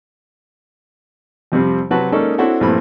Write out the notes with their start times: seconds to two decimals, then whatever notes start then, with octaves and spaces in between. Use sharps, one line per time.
1.52 F2 C3 F3 G3 C4
1.91 C3 F#3 F#4 B4 A5
2.12 G#3 A#3 C#4 D#4 A4 D5
2.38 C4 D4 E4 F#4 A4 C#5
2.60 A#1 G2 E3 A3 C4 B5